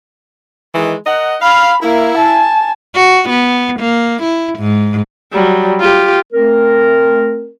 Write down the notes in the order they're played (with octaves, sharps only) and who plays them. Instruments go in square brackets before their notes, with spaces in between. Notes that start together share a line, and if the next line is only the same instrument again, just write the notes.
[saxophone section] D#3 E3 G#3
A#4 D#5 F#5
[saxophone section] F5 [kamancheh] B5
[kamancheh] A#3 [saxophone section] E4
[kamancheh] G#5 A5
[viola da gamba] F#4
B3
A#3
E4
G#2
[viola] F#3 G3
F4 G4
[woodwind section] A3 C4 A#4